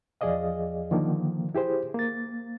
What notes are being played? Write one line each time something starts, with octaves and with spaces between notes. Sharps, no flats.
E2 F3 G#4 D5 D#5 F5
D3 D#3 F3 A#3
E4 G4 G#4 C5
A#3 A6